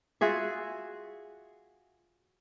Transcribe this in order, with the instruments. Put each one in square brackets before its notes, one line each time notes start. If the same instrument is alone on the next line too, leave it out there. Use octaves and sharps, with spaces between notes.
[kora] F4 F#4 G#4 E5